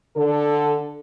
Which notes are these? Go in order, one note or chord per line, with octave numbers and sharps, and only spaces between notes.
D3 A4